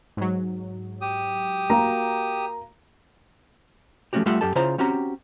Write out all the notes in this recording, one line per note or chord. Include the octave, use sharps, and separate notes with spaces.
G#2 F#3
G4 D#6
A#3 F#4 A#5
F3 A3 A#3 C#4 F#4 G4
G3 A3 F4 G4 E5 F#5
F#2 G4 A4 A5
C#3 E4 F4 C5 C#5 A#5
C4 C#4 F#4 G4 A#5